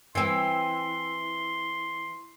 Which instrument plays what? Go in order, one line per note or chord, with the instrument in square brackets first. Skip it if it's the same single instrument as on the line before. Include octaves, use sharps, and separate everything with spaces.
[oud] E3 C4 [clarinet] C6